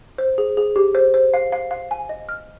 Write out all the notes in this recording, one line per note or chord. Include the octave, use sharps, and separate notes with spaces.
C5
G#4
G#4
G4
C5
C5
F5
F5
F5
G#5
D#5
F6